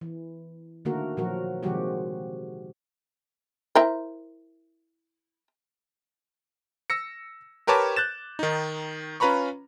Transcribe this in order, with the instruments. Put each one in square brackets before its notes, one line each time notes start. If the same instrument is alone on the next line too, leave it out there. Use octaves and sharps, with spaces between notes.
[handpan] E3
D3 D#3 A3 A#3 F#4 A#4
A#2 F3 F#3 F#4 A#4
C3 D#3 F3 G#3 F#4 G4
[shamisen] E4 A#4 C5
[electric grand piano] E6 A#6 C#7
G4 A#4 B4 C#5 A5 D6
F#6 G6 A6 E7
D#3 D#4
C#4 F4 B4 A#5 B5 C#6